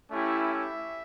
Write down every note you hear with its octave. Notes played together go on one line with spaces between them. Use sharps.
A3 C#4 E4 G4
E5